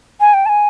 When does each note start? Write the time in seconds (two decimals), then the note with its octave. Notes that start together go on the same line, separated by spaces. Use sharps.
0.20 G#5
0.34 G5
0.46 A5
0.49 G#5